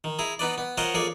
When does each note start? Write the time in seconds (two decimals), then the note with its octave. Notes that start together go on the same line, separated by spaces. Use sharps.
0.04 D#3
0.19 E4 G#4 A#5
0.39 B3 D#4 B4 D5
0.58 B3
0.77 F4 A#4 C5 C#5 D#5 F#5
0.94 F2 A#3 G#4 C#5 D5